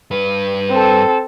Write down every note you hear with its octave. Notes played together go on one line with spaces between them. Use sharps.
G2 B4
C4 A4